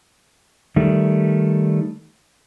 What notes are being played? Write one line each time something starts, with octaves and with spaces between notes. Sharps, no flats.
D#3 G3 A3